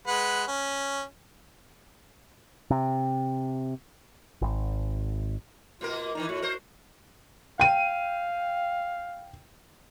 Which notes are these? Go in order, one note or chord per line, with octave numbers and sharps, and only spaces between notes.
G#3 B4 F#5
C#4
C3
G#1
B2 A#3 F4 A#4
A#2 D#3 E3 D#4
A2 F#4
A#4 C5
F5 G5 D#7